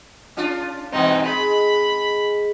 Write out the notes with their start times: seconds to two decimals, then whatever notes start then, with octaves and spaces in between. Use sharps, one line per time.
0.37 C#4 D4 F4
0.92 G2 B2 E3 C4 D#4
1.25 G#3 B5